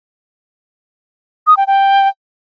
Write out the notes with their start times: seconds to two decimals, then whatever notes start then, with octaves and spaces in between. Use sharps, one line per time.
1.47 D#6
1.57 G5
1.67 G5